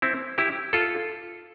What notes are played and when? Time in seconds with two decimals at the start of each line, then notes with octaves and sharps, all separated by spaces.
0.02 C4 E4
0.38 E4 G4
0.73 F4 A4